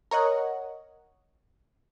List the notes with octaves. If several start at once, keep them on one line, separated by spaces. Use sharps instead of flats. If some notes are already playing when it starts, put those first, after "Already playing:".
A#4 C#5 D#5 F#5